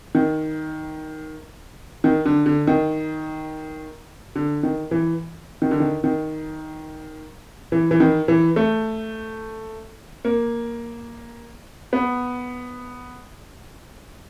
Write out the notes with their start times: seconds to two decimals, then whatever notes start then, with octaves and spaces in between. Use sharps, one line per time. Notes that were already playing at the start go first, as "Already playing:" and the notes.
0.15 D#3
2.04 D#3
2.25 D3
2.46 D3
2.67 D#3
4.35 D3
4.63 D#3
4.91 E3
5.62 D#3
5.71 D3
5.80 D#3
6.04 D#3
7.72 E3
7.91 E3
8.00 D#3
8.28 E3
8.56 A3
10.25 A#3
11.93 B3